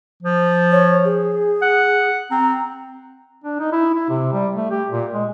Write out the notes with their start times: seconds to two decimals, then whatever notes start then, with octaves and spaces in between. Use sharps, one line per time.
0.23 F3
0.72 C#5
1.05 G#4
1.62 F#5
2.31 C4 A#5
3.44 D4
3.60 D#4
3.72 E4
3.95 E4
4.09 C3
4.33 G3
4.55 A3
4.71 G4
4.91 A#2
5.14 G#3